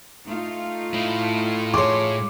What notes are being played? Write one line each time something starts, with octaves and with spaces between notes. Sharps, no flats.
A3 D#4 F4
A2 E4
G#4 C#5 C6 D6